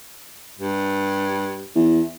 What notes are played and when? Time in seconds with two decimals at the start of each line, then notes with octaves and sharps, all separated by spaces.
0.58 G2
1.75 E2